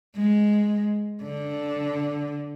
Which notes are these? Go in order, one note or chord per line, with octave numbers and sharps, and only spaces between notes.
G#3
D3